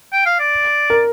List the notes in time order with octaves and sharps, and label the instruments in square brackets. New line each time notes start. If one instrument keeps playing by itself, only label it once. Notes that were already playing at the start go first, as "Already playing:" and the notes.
[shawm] G5
F5
D5
[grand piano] A#4